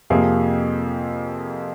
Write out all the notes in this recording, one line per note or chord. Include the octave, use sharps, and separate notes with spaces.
F2 C3 F3 A#3 G#4